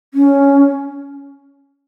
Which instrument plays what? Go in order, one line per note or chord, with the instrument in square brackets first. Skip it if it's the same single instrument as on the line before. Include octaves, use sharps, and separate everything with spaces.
[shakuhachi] C#4